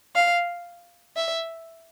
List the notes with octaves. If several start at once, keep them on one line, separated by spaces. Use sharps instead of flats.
F5
E5